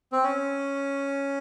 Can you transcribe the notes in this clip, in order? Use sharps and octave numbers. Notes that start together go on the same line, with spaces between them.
C4
C#4